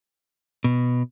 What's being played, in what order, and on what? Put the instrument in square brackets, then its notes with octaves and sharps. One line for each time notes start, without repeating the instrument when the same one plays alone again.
[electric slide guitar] B2